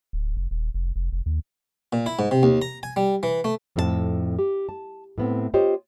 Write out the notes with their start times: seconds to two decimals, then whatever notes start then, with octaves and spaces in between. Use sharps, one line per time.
0.13 D1
0.37 F1
0.51 D#1
0.74 F1
0.96 F1
1.12 F1
1.26 D#2
1.93 A#2
2.06 E4
2.19 G#2
2.31 C3
2.43 D#2
2.62 A#5
2.83 G#5
2.96 G3
3.23 E3
3.44 A3
3.76 F2 A2 C4 F#4 A5
4.39 G4
4.69 A5
5.18 A2 B3 C4
5.54 F4 G4 C5 C#5 D#5